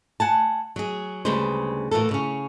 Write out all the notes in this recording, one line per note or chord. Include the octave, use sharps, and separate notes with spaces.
F#5 G#5 A5
F#3 G#4
D2 C#3 G3 G#3 B4 C5
A2 E3 A#3 A4
C#3 C#4